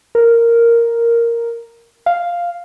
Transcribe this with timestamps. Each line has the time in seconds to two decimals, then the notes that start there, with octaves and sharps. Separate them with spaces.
0.15 A#4
2.06 F5